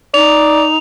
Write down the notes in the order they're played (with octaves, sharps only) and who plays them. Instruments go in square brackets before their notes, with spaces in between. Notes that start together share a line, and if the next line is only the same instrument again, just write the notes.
[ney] D#4 [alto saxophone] D5 [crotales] F7